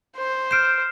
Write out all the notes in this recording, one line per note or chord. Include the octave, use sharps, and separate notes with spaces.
C5
F6 G6 C7 D7 E7